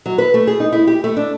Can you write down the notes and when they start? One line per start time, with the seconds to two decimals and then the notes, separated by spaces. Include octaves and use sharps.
0.06 F#3
0.18 B4
0.34 A3
0.47 G#4
0.60 D#4
0.72 E4
0.87 G4
1.04 A3
1.17 D4